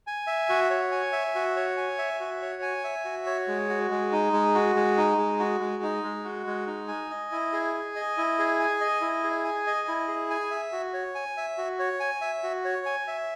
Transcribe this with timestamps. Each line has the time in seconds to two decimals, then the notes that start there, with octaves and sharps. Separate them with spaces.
0.07 G#5
0.27 E5
0.49 F#4
0.70 C#5
0.92 G#5
1.12 E5
1.35 F#4
1.56 C#5
1.77 G#5
1.98 E5
2.20 F#4
2.42 C#5
2.62 G#5
2.84 E5
3.05 F#4
3.26 C#5
3.48 G#3
3.69 F#4
3.91 G#3
4.12 D#4
4.33 G#3
4.55 F#4
4.75 G#3
4.97 D#4
5.18 G#3
5.40 F#4
5.61 G#3
5.83 D#4
6.04 G#3
6.24 F#4
6.47 G#3
6.67 D#4
6.88 G#5
7.10 D#5
7.32 E4
7.53 G#4
7.74 G#5
7.96 D#5
8.17 E4
8.39 G#4
8.60 G#5
8.81 D#5
9.01 E4
9.24 G#4
9.44 G#5
9.67 D#5
9.88 E4
10.08 G#4
10.30 G#5
10.51 E5
10.72 F#4
10.93 C#5
11.15 G#5
11.37 E5
11.58 F#4
11.79 C#5
12.00 G#5
12.21 E5
12.43 F#4
12.65 C#5
12.86 G#5
13.07 E5